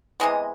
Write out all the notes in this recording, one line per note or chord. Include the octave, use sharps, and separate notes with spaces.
C3 E3 G#3 B3 D#5